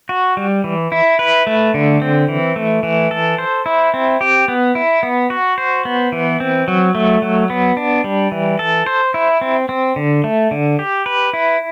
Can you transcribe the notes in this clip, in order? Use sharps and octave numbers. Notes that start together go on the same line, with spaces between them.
F#4
G3
E3
E4
B4
A3
D3
C4
E3
A3
E3
A4
C5
E4
C4
G4
B3
E4
B3
F#4
C5
B3
E3
C4
F#3
A3
F#3
B3
D4
G3
E3
A4
C5
E4
C4
C4
D3
A3
D3
G4
B4
E4